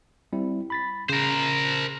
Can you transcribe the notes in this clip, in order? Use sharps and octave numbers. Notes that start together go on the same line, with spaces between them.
G3 C4 E4
B5 A6 B6
C#3 A#4 C5